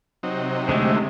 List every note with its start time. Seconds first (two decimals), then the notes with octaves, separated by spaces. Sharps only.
0.23 C3 F#3 C4 D#4
0.69 D3 G#3 A3